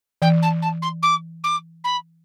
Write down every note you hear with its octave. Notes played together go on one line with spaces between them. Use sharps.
E3 G5
A5
A5
C6
D6
D6
B5